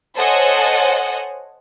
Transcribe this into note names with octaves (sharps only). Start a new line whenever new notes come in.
A4 C5 C#5 D#5 F#5 G#5